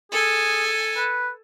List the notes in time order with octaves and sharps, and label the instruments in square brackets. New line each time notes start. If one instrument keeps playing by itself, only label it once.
[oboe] G#4 [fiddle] A4 G#5
[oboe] B4